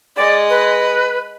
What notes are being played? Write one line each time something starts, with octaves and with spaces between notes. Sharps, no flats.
G#3 D5 D#5
B4